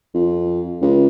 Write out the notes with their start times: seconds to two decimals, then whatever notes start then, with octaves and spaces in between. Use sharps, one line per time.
0.14 F2
0.82 C#2